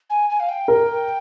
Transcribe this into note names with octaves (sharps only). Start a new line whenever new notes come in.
G#5
G#5
F5
G5
A#4